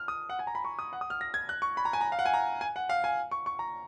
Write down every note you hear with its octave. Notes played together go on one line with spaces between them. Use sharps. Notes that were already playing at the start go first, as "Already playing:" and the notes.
Already playing: F6
D#6
F#5
G#5
A#5
B5
C#6
D#6
F#5
D#6
F6
A#6
G#6
F#6
C#6
B5
A#5
G#5
A#5
F5
F#5
G#5
A#5
G#5
F#5
F5
G#5
C#6
C#6
A#5